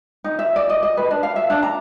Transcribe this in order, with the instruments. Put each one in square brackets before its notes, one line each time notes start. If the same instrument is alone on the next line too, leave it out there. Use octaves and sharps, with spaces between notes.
[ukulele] D#4
E5
D5
D#5
D#5
B4
D4
F5
E5
D4
A#5